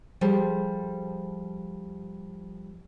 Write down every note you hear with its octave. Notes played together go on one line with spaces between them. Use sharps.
F3 G3 G#4 A4 C5